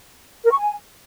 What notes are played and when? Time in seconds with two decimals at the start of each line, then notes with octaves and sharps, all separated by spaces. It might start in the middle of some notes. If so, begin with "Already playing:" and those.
0.45 A#4
0.51 C#6
0.57 G#5